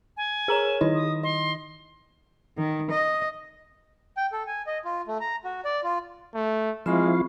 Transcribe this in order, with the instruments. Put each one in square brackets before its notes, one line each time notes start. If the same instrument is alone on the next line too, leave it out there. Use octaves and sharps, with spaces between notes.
[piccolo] G#5
[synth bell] G#4 A#5 E7 [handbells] A#4 C#5
[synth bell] D#3 D#4 E4 [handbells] D#5
[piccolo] D#6
[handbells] D#5 [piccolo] C6
[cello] D#3
D#5
[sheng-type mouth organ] G5
A4
G#5
D#5
F4
A3
A#5
F#4
D5
F4
[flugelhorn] A3
[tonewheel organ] F3 E4 F5 [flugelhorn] G#3 [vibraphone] C4 B5 C#6